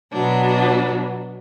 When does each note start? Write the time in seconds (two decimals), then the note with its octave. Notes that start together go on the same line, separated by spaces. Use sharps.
0.12 B2 F#3 B3 D4